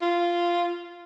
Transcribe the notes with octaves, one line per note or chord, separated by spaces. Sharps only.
F4